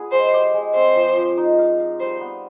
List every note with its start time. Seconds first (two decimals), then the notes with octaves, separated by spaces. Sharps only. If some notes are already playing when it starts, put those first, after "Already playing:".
Already playing: B3 F4 G#4
0.12 G#3 C5
0.33 G4
0.54 G#3
0.75 C4 C5
0.96 F3
1.17 F3
1.37 D#4
1.58 F5
1.80 F5
2.00 G3 C5
2.21 B3